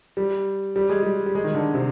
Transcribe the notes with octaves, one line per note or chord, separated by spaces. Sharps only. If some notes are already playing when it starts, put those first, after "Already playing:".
G3
G3
G#3
G3
G3
G#3
D#3
D3
C3